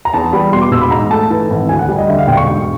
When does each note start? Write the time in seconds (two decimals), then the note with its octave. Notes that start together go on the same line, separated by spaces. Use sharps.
0.05 A#5
0.14 E2 A5
0.33 G3 B5
0.52 B2 C6
0.61 D6
0.71 E1 E6
0.81 B5
0.91 G#2 A#5
1.11 A3 A5
1.30 E3
1.50 G#1
1.69 D2 G#5
1.79 F#5
1.89 G3
1.98 D#5
2.09 D3 E5
2.19 F5
2.27 E1 G5
2.37 C#6
2.47 G#2